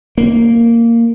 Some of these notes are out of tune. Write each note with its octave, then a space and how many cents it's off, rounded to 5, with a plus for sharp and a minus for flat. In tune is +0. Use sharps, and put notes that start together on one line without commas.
A#3 -10